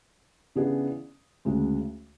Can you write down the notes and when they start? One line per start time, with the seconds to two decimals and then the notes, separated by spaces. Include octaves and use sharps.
0.55 C#3 E3 B3 D4 G#4
1.45 D2 C#3 G#3